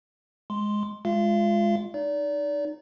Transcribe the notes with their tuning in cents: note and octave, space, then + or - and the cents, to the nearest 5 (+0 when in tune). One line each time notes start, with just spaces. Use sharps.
G#3 +0 C6 +0
G#3 +0 F4 +0 F5 -40
D#4 -15 D5 -30